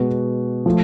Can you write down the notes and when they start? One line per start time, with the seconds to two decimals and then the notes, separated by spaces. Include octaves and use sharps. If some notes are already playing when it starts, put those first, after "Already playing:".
Already playing: B2 G#3 B3 F#4
0.66 F3 A3